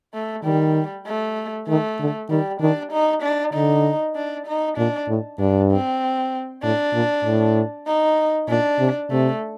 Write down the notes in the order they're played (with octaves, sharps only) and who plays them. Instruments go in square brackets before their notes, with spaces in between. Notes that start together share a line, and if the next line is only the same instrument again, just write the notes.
[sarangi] A3
[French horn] D#3 [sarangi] G3
[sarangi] A3
[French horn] D#3 [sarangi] A3
[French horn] D3
[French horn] D#3 [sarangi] G3
[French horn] D#3 [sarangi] D4
[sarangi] D#4
D4
[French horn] D3 [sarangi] D#4
[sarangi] D4
D#4
[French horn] A#2 [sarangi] D4
[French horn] A2
[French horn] G2 [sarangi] D4
[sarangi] C4
[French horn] A2 [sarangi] D4
[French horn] A#2
A2
[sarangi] D#4
[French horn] A#2 [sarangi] D4
[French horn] C3
[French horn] C3 [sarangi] A3